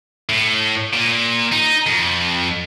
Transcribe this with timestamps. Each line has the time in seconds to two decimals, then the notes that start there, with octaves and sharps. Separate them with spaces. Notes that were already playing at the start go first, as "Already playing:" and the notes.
0.29 A2
0.93 A#2
1.52 D#4
1.87 F2